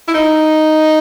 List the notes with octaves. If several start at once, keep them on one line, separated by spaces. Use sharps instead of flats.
E4
D#4